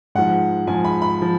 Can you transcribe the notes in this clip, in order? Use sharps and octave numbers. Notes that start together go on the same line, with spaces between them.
G#2 F3 F#5
G#2 F3 G#5
B5
B5
F3